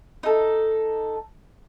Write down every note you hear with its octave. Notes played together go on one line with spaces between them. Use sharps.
D#4 A4